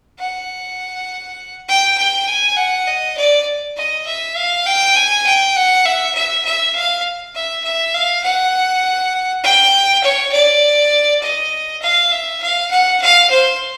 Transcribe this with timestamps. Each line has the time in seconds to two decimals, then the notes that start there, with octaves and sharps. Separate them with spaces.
0.19 F#5
1.68 G5
1.98 G5
2.27 G#5
2.57 F#5
2.87 D#5
3.17 D5
3.76 D#5
4.06 E5
4.36 F5
4.66 G5
4.96 G#5
5.26 G5
5.56 F#5
5.85 E5
6.15 E5
6.45 E5
6.75 F5
7.35 E5
7.64 E5
7.94 F5
8.24 F#5
9.43 G5
10.03 C#5
10.32 D5
11.22 D#5
11.82 F5
12.11 E5
12.42 F5
12.71 F#5
13.01 F5
13.30 C5